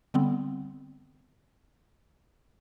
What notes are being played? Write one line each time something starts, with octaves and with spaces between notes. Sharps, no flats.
D3 G3 B3 C4